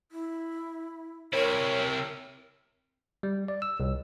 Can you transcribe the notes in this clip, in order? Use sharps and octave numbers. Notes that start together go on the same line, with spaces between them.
E4
C3 E4 A#4 C#5
G3
D5
E6
C2